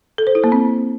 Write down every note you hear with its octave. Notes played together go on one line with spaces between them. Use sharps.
A4
C5
E4
A#3
C4